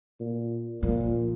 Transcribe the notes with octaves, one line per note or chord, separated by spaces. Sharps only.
A#2
A#2 F3